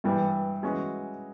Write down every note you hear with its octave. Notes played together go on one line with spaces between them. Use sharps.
G2 E3 G3
E3 G#3 C#4 F#4